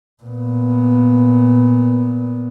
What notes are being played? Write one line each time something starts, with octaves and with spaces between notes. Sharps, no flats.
A#2 B3